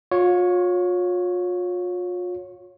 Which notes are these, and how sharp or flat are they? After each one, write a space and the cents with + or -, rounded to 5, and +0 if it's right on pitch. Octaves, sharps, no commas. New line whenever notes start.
F4 +40 C#5 +0